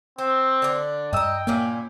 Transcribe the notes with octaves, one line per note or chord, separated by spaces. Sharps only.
C4 C5
D3 D4
G2 D#5 G5 A#5 E6
A#2 A#3 C#4 E4